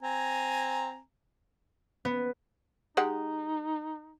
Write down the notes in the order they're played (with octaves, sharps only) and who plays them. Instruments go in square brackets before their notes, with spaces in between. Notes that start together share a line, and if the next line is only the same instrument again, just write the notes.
[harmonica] C4 G#5 A#5
[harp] B3
[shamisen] G#3 G4 F#5 [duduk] D#4